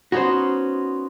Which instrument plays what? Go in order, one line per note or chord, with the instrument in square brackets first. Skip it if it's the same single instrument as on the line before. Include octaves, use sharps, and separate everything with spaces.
[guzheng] B3 C#4 D#4 [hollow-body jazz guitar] F#4 C5